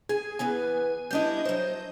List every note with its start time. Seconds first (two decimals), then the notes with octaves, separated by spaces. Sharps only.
0.09 G#4 G#5
0.39 E3 B3 B4 G#5
1.11 G3 D4 E4 D#5 G6
1.45 F#3 C5